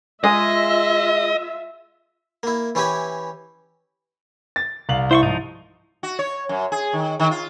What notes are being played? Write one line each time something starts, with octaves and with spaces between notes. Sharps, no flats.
G#3 F4 D#5 E5
A#3 E4
E3 C#4 E4 G4 G#5 B5
A6
C2 F5 F#7
E4 C5 E5 C6 C#6
G#2 F3 D#4
F#4
C#5
F#2
G#4
D#3
D#3
F4